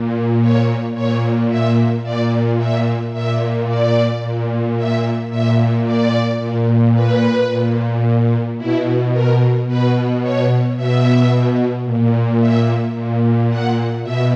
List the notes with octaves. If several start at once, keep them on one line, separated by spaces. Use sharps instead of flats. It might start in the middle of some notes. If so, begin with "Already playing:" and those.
Already playing: A#2
C#5
A#2 C#5
E5
A#2 D5
E5
A#2 E5
D5
A#2
E5
A#2 E5
D5
A#2
B4
A#2
B2 E4
A#4
B2 B4
C#5
B2 E5
A#2
E5
A#2
F#5
B2 E5